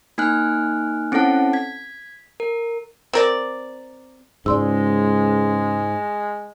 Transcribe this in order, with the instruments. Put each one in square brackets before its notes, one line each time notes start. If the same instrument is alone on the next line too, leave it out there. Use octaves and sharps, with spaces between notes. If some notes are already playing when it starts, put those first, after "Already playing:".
[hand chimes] A#3 D#4 G#5 F6 F#6
C4 C#4 E4 A4 F#5 A5
G#6 B6
A#4
[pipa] C4 A#4 D5
[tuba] C#2 [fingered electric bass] G#2 [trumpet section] G#3 [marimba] D5 C6 E6